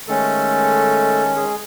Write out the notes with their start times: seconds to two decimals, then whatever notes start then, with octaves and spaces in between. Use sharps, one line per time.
0.08 D#3 G#3 A3 C#4 A4
1.36 G#3 G#4